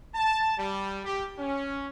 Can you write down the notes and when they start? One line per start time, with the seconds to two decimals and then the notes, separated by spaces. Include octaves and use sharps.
0.14 A5
0.58 G3
1.04 G4
1.39 C#4